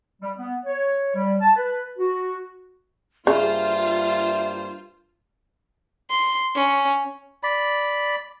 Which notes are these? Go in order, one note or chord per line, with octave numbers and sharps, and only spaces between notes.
G3
B3
C#5
G3
A5
B4
F#4
G2 C#3 A#3 F4 C5 E5
C6
C#4
D5 B5